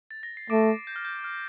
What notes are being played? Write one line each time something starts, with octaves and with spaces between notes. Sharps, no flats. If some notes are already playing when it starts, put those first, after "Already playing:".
A6
A#6
C7
A3 D6 D7
G6
F6
G6
F6